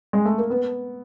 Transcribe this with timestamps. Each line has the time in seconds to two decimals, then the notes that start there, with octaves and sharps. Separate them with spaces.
0.13 G#3
0.25 A3
0.38 A#3
0.50 B3